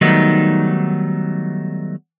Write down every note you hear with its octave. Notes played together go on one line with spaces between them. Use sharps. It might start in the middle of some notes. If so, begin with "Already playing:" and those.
D#3 F#3 G3 A3 B3 D#4